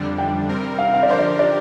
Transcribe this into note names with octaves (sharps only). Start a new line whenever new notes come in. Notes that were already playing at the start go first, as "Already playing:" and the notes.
Already playing: F2 D3 G3 D4
G5
C3 G3 C4 A#4
F5
F5
D5
D3 F3 D4 G4 A#4 C5
D5
D5